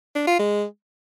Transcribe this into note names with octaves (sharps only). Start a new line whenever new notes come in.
D4
F4
G#3